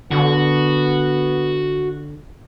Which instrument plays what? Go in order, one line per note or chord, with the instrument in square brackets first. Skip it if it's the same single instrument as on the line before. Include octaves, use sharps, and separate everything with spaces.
[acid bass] D3 [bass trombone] B3 [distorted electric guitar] F#4